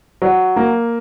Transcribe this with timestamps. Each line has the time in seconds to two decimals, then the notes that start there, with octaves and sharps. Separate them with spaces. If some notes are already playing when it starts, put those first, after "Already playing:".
0.22 F#3
0.56 A#3